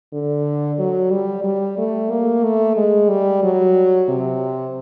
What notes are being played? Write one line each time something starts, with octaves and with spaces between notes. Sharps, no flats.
D3
F#3
G3
G3
A3
A#3
A3
G#3
G3
F#3
C3